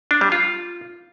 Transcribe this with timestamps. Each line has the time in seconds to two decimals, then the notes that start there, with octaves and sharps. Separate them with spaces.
0.11 D4
0.21 G3
0.32 F4